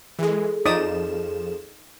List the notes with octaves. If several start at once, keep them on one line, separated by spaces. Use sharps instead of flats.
E3 G#3 G#4 A4
F2 F3 D#4 D5 D#6 E7